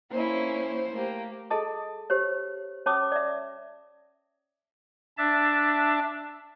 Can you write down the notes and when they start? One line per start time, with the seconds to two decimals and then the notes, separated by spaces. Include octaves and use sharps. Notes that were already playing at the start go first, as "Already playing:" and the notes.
0.11 A#3 C#4 E4 C5
0.91 A3 A#3 G4
1.50 G#4 A4 D#5 A5 D#6
2.10 G4 C5 C#5
2.86 C#4 C#5 A5 D6 D#6
3.12 D5 E5
5.18 D4 E5 A5